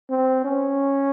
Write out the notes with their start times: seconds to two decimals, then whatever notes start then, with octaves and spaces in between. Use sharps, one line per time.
0.10 C4
0.45 C#4